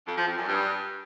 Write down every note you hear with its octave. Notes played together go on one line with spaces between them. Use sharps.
F2
F3
F2
F#2
G2